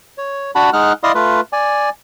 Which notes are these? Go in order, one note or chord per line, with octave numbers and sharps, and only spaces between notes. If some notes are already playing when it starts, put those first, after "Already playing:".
C#5
D4 F#4 F#5 A5 B5
G#3 D#4 F#5 F6 F#6
E4 D5 D#5 F5 C6 D#6
A3 F4 B4
D5 G#5